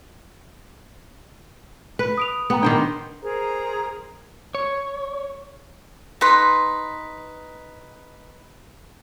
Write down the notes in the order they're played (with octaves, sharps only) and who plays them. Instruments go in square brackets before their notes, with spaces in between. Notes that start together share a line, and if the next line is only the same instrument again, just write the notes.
[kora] B4
[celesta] D#6 D7 F7
[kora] B3 [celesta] G4 G5 A#5
[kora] D#3 C5 G5 [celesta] D4 D6
[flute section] G#4 A#4 C5 A#5
[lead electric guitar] C#5
[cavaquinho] D#4 B4 C6